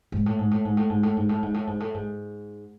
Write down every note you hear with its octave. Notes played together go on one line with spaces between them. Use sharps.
G#2
A2
G#2
A2
G#2
A2
G#2
A2
G#2
A2
G#2
A2
G#2
A2
G#2